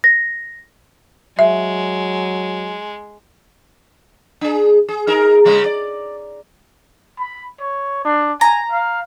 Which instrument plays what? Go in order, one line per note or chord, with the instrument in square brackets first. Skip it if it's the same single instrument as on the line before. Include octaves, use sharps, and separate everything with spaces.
[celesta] A#6
[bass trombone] F#3 [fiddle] G#3 [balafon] E5
[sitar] D4 G#4
G#4
D#4 G#4 A#4
C#3 G3 G#3
D5
[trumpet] B5
C#5
D4
[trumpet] G#5 [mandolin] A#5
[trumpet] F5